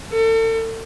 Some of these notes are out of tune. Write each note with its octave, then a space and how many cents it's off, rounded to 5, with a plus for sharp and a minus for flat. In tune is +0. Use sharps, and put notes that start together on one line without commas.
A4 +40